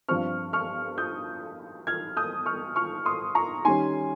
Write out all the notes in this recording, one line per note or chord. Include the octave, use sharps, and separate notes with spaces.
G2 F3 C4 C#6 F6
C#6 F6
D#6 G6
F6 G#6
D#6 G6
C#6 F6
C#6 F6
C6 D#6
A#5 C#6
D#3 G3 C#4 G#5 C6